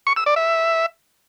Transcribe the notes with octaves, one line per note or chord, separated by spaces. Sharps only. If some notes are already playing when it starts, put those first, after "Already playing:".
C#6
E6
D5
E5